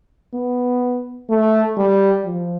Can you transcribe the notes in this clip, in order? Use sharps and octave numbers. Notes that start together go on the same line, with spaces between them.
B3
A3
G3
F3